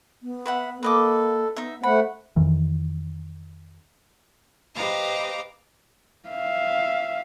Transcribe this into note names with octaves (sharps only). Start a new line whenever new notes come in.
B3
B4 E5 F#5
A#3 A4 B4 D#5 D6
B3 D#4 E5
A3 C5 F#5 B5
F2 D#3 E3
G4 B4 C5 D#5 F5 A#5
E5 F5